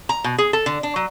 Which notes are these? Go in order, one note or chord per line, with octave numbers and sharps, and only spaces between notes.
A#5
B2
G#4
A4
D3
D4
F#3